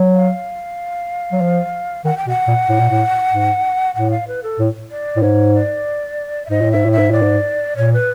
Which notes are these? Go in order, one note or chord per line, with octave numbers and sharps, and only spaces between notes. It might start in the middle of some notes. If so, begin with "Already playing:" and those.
Already playing: F#3
F5
F#3
F3
D#3 F#5
G5
B2 F#5
A#2
A2
A#2
A2
G#2
A2 F#5
F5
B4
A4
A2
D5
A2
G#2 C#5
D5
E5
G#2 D#5
A2
G#2 E5
A2
E5
G#2
A2 D5
G#2
A#2 C#5
B4